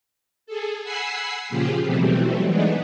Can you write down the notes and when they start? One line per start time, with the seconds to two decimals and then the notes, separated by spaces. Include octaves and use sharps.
0.46 G#4 A4
0.84 F#5 G#5 B5 E6 C7
1.49 A#2 C#3 F3 F4 G4 G#4
1.83 B2 E3 F#3 G3 A3 C4
2.46 E3 G#3 A3 B3 D4 D#4